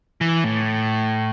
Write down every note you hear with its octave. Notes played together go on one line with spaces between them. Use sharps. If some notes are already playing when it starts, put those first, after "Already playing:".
E3
A2